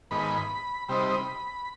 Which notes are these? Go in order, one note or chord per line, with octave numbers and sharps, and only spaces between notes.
G#2 D#3 B3 B5
C3 G3 C4 D#4 B5
B5